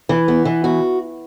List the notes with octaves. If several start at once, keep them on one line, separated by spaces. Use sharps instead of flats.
E3
B3
E3
F#4